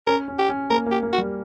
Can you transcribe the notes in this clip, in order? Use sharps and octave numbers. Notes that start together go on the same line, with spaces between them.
C#4 A#4
C#4
G4
C#4
A#3 A#4
A#3
G4
A#3
F#4
G3